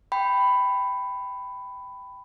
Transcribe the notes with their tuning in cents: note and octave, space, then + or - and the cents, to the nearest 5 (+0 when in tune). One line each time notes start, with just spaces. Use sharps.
G5 +0 B5 +10